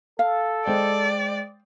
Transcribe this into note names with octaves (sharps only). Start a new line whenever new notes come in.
A4 F5
G#3 C5 D5 G5